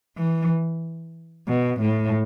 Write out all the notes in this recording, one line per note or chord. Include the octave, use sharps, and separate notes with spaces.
E3
B2
A2